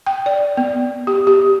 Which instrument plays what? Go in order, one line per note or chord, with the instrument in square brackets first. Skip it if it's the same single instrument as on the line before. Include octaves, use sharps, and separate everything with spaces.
[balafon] G5
D5
B3
G4
G4